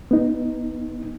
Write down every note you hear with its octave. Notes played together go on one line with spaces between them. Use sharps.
B3 D#4